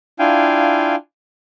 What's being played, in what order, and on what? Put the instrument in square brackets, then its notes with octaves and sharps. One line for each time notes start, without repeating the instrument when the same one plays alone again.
[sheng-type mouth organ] D4 E4 F4 F5 G5 G#5